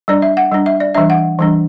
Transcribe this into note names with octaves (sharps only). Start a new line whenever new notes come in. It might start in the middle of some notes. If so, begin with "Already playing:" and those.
G3 D4 D5
E5
F#5
G3 D4
E5
D5
E3 G3 D4 E5
F#5
E3 G3 D4